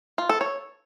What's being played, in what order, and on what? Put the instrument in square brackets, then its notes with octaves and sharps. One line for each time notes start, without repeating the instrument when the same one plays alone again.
[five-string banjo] F4
A4
C#5